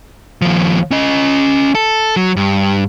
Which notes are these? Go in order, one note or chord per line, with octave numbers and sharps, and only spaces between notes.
D#2 F3
C#4 D#5
A4
F#3
G2